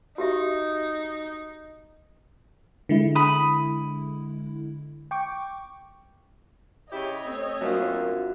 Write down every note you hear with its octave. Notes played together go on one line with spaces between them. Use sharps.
D#4 F#4 G4 E5
D3 G#3 E4
B5 D#6
G5 C#6 D6
C#3 E4 G4 C#5 D#5
A3 C4
F#2 F#3 A#3 D4 F4